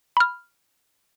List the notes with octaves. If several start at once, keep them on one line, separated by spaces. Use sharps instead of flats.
B5 F6